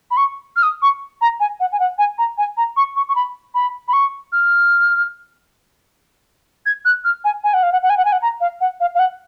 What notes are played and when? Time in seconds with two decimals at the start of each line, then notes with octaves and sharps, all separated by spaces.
0.11 B5
0.17 C#6
0.56 F6
0.63 D#6
0.82 C#6
1.21 A#5
1.40 G#5
1.60 F#5
1.72 G#5
1.79 F#5
1.98 G#5
2.18 A#5
2.38 G#5
2.57 A#5
2.77 C#6
2.96 C#6
3.08 C#6
3.15 B5
3.55 B5
3.88 B5
3.93 C#6
4.32 F6
6.66 G#6
6.85 F#6
7.05 F6
7.24 G#5
7.44 G#5
7.54 F#5
7.63 F5
7.72 F#5
7.82 F#5
7.90 G#5
7.97 F#5
8.05 G#5
8.12 F#5
8.22 A#5
8.41 F5
8.61 F#5
8.80 F5
8.95 F5
8.99 F#5